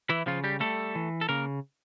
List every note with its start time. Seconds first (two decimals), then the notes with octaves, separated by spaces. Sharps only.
0.10 E3 E4
0.26 C#3 F3 F4
0.44 G3 G4
0.60 G3 A3 A4
0.95 E3
1.21 A4
1.29 C#3 A#3 A#4